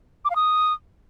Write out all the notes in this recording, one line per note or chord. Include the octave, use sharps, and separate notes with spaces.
D6
F5
D#6